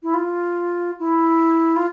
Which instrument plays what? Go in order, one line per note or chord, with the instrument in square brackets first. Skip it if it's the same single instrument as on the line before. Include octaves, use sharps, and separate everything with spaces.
[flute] E4
F4
E4
F4